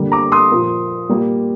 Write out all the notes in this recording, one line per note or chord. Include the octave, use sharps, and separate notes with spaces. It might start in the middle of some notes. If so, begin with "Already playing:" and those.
Already playing: D3 G3 A#3
A#5 D6
C6 D#6
A#2 F3 A#3
A#2 G3 A#3